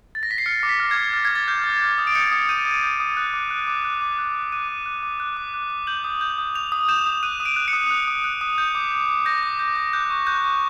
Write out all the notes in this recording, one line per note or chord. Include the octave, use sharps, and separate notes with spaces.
A6
A#6
B6
C7
F6 C#7
D6
B6
F6
G#6
D6
F6 A6
G#6
D6 A6
F6 G6
D6
G6
D#6
D7
G6 C#7
D#6
G6 D#7
D#6
G6
D#6
F#6
D6
F#6
D6
F#6
D6
F#6
D6
F#6 D#7
D6
F#6
D6
F#6
D6
F#6
D6
G6 F#7
D#6
G6
D#6
G6 F7
D#6
G6 E7
D#6
F#6 D#7
D#6
D7
F#6
C#7
D#6
F#6
D#6
F#6
D#6
G6
D6
G6
D6
G6 A#6
D6
G6
D6
F#6 G6
C#6
F#6 G6
C#6